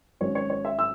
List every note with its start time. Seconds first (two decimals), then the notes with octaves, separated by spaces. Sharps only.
0.20 G#1 G#2 F#3 C#4 C#5
0.35 C#5
0.50 C#5
0.65 E5
0.79 E6